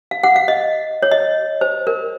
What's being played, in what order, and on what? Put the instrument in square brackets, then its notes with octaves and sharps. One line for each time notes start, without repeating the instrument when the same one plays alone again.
[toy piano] F5
F#5
F5
D#5
C#5
D#5
C5
A#4